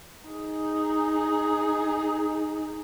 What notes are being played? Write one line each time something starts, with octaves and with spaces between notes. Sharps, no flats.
D#4 G#4